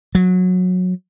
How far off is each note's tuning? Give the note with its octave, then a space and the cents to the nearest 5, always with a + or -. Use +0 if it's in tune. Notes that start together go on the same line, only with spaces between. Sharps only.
F#3 -20